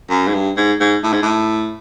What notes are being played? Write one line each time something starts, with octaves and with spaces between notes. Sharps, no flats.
F#2
G#2
G2
G#2
G#2
A2
G#2
A2